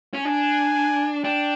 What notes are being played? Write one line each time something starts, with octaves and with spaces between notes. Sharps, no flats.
C#4
D4 G#5
D4 G5